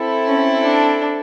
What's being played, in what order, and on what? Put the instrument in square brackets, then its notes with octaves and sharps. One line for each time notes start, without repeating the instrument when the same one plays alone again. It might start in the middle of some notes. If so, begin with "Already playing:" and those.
Already playing: [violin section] C4 E4 A4
[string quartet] C#4
D4